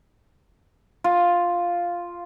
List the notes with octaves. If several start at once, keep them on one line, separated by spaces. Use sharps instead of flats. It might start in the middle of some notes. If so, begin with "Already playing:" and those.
F4